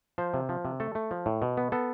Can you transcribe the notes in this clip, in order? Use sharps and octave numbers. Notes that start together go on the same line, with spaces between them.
F3 C5
C3
F3
C3
A3 A4
A3
F3
A2
B2
B3
B3 A4